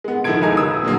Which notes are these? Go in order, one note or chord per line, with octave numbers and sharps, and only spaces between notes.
G#3 B3
D#3 F3 E4 A4 G#6 D7
C#2 D#4 G#5 A#5 G#6
D#1 B4 D#6 E6
A#2 D3 F#3 A#3